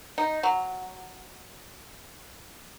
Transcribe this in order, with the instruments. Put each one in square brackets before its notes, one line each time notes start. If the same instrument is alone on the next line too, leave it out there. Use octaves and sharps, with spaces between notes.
[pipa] D#4
F#3